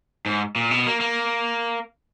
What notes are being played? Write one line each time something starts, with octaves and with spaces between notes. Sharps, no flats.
G#2
A#2
B2
A#3
A#3